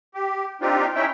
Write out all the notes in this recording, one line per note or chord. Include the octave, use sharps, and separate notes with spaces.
G4
C4 D4 D#4 F4 G4
C#4 D#4 E4 E5 G5